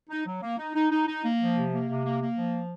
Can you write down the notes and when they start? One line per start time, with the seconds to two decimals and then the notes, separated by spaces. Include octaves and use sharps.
0.10 D#4
0.26 F#3
0.43 A#3
0.59 D#4
0.75 D#4
0.92 D#4
1.08 D#4
1.24 A#3
1.40 F3
1.57 C3
1.73 A#3
1.89 C3
2.05 A#3
2.21 A#3
2.37 F3